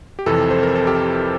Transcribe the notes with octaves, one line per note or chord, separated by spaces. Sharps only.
G4
F2 C3 E3 A4
C5
A#4
A4
G4